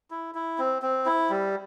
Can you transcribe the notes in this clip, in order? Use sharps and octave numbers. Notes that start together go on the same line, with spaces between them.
E4
E4
C4
C4
E4
G3